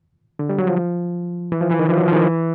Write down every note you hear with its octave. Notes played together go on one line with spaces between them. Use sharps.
D3
G3
F#3
F3
E3
F3
E3
D#3
F3
F#3
D#3 F3
E3